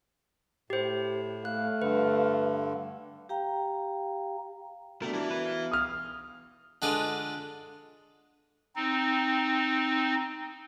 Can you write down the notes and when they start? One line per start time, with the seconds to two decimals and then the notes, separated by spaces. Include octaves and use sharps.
0.70 A2 G4 C5
1.45 A3 F5 F#6
1.82 G2 D3 B4
3.29 G4 F5 G5 A#5
5.02 B2 A3 D4 G4 A#4
5.14 E3 E4
5.31 B4
5.46 F5
5.71 D#6 F6
6.82 D3 G#3 F4 B4 D6
8.76 C4 D#4